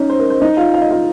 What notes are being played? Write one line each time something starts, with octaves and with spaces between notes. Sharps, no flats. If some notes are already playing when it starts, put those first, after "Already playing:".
Already playing: C#4 D#4 C#5 D#5
C5
A#4
C5
D#4 D#5
F4 F5
F5
D#5
F4 F5